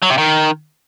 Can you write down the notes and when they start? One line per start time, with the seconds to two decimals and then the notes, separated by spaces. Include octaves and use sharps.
0.02 F#3
0.10 C3
0.18 D#3